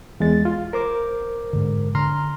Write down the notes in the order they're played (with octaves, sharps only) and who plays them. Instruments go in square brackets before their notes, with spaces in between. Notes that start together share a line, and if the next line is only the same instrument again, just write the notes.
[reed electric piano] E2 G#3 A6
F4
A#4 C5 D6
[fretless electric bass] G#2 D3
[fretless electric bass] D3 [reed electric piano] A#5 C6 F6